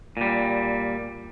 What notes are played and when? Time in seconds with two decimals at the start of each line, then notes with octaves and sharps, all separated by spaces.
0.17 A#2 G3